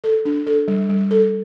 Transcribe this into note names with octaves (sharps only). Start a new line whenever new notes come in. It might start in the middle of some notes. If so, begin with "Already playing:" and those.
A4
D4
A4
G3
G3
A4